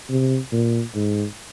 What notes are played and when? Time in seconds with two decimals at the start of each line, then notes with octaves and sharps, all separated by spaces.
0.09 C3
0.52 A#2
0.95 G#2